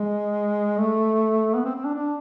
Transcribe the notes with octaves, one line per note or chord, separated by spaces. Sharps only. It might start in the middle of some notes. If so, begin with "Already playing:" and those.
Already playing: G#3
A3
B3
C4
C4
D4
D4